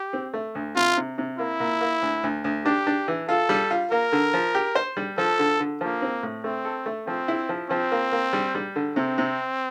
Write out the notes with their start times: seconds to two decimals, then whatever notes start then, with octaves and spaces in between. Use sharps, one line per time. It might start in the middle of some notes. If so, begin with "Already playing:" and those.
Already playing: G4
0.13 C4
0.34 A3
0.55 D2
0.76 C3 F4
0.97 C3
1.18 C3
1.39 A#3 E4
1.60 A#2
1.81 A#3
2.02 D2
2.23 D2
2.44 D2
2.65 D4 G4
2.87 D4
3.08 E3
3.28 F4 A4
3.49 G3
3.71 F4
3.91 A#3 A#4
4.12 D3
4.34 F3
4.54 G4
4.75 C5
4.97 G3
5.18 F3 A4
5.39 D3
5.60 D3
5.81 F3 A#3
6.02 C4
6.23 A2
6.44 A3 C4
6.65 A4
6.86 A3
7.07 F3 C4
7.28 E4
7.49 F3
7.70 F3 C4
7.92 A#3
8.12 A#3
8.33 G3
8.55 G3
8.76 D3
8.96 C3 C4
9.18 C3